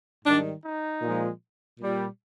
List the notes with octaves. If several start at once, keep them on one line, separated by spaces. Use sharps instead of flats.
G#2 D#3 G3 D4
D#4
A#2 F3 G#3
A#2 G3